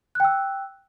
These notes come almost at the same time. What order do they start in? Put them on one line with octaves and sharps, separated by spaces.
F#6 G5 E6